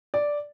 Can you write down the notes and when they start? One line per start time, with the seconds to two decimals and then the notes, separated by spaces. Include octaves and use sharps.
0.14 D5